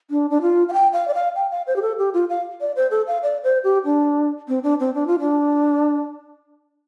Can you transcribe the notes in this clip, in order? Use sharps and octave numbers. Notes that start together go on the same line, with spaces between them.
D4
D4
F4
F5
G5
F5
D5
F5
G5
F5
C5
G4
A4
G4
F4
F5
D5
C5
A4
F5
D5
C5
G4
D4
C4
D4
C4
D4
F4
D4